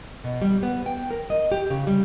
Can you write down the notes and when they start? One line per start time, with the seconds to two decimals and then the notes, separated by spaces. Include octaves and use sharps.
0.24 B2
0.42 G3
0.63 B3
0.86 G5
1.11 A#4
1.30 D#5
1.52 G4
1.70 C#3
1.87 G3